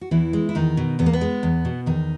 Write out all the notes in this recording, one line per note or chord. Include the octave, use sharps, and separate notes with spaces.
F#4
E2 E3 E4
G#3
E4
E2 D#3 D#4
B2
E2 B3
A#3
B3
G#3
E2
B2
E2 D#3 D#4